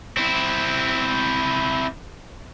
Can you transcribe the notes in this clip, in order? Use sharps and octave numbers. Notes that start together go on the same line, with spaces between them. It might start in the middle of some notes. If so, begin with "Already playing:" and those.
C4 E4